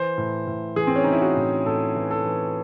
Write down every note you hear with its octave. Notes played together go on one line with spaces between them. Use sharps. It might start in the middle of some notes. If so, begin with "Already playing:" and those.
Already playing: E3 C5
A2
A2
E3 G#4
C4
C#4
E3 D#4
E4
F#4
A2
A2 A4
E3
A4
E3